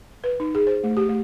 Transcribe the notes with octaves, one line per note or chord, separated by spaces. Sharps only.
B4
D#4
G#4
C5
A3
G4
A3